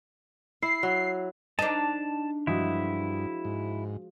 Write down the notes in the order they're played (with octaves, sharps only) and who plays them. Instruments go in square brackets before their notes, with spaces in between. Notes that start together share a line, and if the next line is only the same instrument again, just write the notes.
[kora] E4 [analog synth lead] C7
[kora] F#3
[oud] D4 D#4 [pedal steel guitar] A5
[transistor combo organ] G2 [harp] F3 G#3 F#4 [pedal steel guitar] E4
[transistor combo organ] G#2